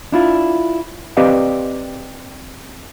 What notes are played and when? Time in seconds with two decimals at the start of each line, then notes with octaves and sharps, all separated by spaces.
0.12 D4 E4 F4
1.17 C4 G4 B4 D5 D#5 F5